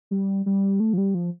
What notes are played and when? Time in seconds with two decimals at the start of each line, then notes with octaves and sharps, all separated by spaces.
0.11 G3
0.46 G3
0.80 A3
0.93 F3
0.98 G3
1.14 F3